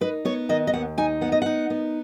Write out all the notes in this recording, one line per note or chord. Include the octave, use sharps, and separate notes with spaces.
D#4 B4
B3 C#5
D#3 D#5
D#5
D#2 F#5
D#4 G#5
B3 F#5
D#5
D#4 F#5
B3